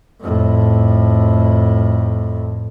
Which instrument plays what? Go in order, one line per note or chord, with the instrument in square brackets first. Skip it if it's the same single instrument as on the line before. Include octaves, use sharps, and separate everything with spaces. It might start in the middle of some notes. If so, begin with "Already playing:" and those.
[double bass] F2 A2